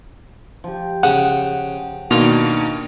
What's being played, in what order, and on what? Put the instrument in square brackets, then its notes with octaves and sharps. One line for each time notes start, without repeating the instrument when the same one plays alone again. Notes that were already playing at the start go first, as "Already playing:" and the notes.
[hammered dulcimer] F3 G4
[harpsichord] C#3 [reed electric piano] F#5
[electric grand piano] B2 D#3 A#3 [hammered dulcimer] D4 A5 C6 [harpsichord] F4